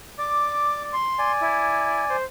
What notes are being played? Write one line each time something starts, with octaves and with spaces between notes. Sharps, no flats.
D5 D6
C6
D5 G#5
E4
C5